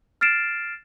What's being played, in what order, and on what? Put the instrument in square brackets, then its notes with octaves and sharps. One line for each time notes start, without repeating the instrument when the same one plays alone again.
[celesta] F6 A6 C7 D7 E7